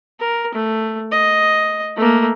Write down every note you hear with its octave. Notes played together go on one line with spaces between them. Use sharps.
A#4
A3
D#5
A3 A#3